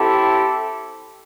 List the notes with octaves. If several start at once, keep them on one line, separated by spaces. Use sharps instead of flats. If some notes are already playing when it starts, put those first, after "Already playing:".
Already playing: C4 E4 G4 A4